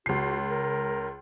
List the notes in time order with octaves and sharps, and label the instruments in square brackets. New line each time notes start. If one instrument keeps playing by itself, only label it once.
[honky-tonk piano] C#2 C7 [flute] F#4
[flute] A#4